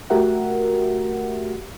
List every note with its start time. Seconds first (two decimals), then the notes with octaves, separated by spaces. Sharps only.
0.10 A3 F#4 G4 A#4 E5 F#5